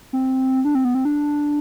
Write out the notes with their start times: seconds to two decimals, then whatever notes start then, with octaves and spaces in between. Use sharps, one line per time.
0.13 C4
0.65 D4
0.75 C4
0.85 B3
0.95 C4
1.05 D4